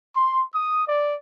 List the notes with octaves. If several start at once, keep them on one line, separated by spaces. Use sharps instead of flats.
C6
D#6
D5